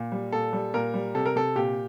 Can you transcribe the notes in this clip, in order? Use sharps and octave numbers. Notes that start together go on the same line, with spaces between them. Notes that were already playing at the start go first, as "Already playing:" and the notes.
Already playing: A#2
G3
A#2 A4
G3
A#2 A#4
G3
C3 A4
A#4
C3 A4
A#2 G4